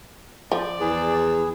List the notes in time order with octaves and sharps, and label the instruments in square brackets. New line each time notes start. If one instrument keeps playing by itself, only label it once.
[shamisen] F3 [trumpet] D5
[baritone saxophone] E2 [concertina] G#4